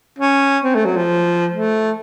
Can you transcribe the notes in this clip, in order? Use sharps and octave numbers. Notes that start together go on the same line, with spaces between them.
C#4
C4
A3
F#3
F3
A3